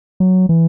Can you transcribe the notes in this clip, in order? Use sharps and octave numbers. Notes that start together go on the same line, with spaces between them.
F#3
E3